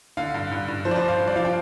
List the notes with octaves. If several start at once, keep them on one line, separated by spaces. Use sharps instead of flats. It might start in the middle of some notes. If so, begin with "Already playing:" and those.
D3 F5
G2
G2
G2
F3 C5
D5
C5
G2
F5
G2
D5
F3 F5
G5